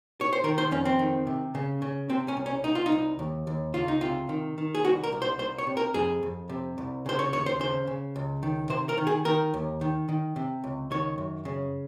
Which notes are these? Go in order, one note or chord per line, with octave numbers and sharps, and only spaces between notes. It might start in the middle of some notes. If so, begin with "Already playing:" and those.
C#5
C5
D#3 A#4
C5
F2 C#4
C4
D#3
C3
C#3
C#3
C3 C4
C#4
C2
C#4
C2 D#4
F4
D#4
C2
D#2
D#2
C#2 F4
D#4
C3 F4
D#3
D#3
G#4
C2 F#4
A#4
C2
C5
C2 C5
C#5
C3
A#4
F2 G#4
F2
C3
C2
C#3 C5
C#5
D#2 C#5
C5
C#3 C5
C#3
C#2
D#3
C3 C5
A#4
D#3
G#4
D#3 A#4
D#2
D#3
D#3
C3
C#2
D#3 C#5
F#2
C#3